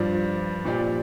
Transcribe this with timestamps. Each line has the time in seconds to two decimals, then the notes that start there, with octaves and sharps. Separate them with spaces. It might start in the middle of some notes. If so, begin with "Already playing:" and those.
Already playing: G2 F3 D4
0.65 A#2 F3 D4 G4 D5